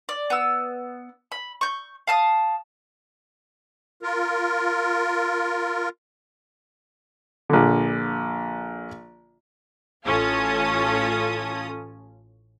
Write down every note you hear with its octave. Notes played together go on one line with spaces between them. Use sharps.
D5
B3 E6
B5
C#6 G6
F5 A5 D#6
F4 A#4
A#1 D3
A1 C#4 F4 A4 D#6